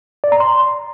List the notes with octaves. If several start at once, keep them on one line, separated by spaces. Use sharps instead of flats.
D5
A#5
C6